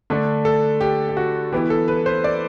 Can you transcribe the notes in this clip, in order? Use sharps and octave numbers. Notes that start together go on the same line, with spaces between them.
D3 A3 D4
A4
G4
G4
F#4
E3 B3 E4 G4
A4
B4
C5
D5